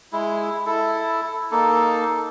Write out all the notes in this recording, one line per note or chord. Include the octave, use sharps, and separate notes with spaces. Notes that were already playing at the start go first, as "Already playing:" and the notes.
G#3 E4
E4 A4
A#3 D#4 A4